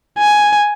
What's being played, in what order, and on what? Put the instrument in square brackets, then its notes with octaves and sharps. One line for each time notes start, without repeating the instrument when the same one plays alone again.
[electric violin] G#5